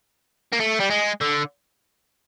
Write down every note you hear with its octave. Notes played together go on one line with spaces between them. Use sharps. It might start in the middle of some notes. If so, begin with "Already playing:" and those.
A#3
A3
G3
G#3
D3